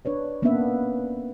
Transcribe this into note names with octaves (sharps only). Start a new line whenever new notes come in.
D4 B4 C#5 D5
A#3 B3 C#4 D4 B4 E5